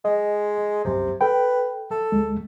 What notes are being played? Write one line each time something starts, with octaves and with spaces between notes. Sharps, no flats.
G#3 D#5
C2 F#2 C3
A4 B4 G5
A4
D2 G#3